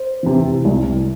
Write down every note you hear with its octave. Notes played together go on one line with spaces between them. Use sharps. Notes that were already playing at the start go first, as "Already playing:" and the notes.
Already playing: C5
C3 E3
C2